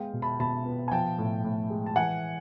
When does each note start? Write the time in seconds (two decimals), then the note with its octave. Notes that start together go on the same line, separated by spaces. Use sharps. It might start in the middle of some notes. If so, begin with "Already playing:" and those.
Already playing: G#3 B3 F5 G5
0.13 B2
0.22 A5 B5
0.40 B2 A5 B5
0.66 B3
0.88 G#5
0.92 F3 G5 A5
1.18 A2
1.44 A2
1.70 G#3
1.86 A5
1.96 E3 F#5 G#5